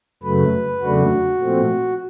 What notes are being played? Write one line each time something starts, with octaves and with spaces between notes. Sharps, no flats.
F#2 C#3 F#3 A3 B4
E2 C#3 F#3 A3 D4 F#4
A#2 F3 A3 C4